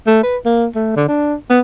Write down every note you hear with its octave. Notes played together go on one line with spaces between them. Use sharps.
A3
B4
A#3
A3
D3
D4
B3